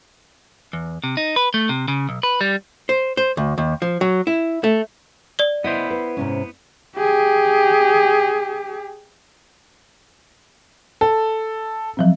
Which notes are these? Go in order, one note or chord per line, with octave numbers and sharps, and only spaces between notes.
E2
C3
D#4
B4
A3
C3
C#3
B1
B4
G3
C5
C5
D2
D#2
F3
F#3
E4
A3
D5 G7
B3 E4 C5 D#5
B4
G#2 C3 C#4
G4 G#4
A4
F3 F#3 C4